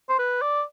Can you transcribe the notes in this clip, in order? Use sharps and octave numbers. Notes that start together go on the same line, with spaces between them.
C5
B4
D5